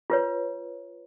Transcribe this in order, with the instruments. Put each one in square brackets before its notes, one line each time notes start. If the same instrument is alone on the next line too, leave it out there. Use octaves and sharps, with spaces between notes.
[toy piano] F4 B4 C#5